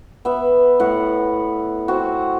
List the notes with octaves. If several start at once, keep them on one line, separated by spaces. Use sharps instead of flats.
B3 E5
A2 F#5
C4 F#4